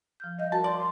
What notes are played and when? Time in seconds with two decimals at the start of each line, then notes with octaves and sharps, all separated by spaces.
0.20 F3 F6 G6
0.39 G3 D#5 F5 G6
0.52 F#4 A#4 A5
0.64 D5 C6
0.77 C6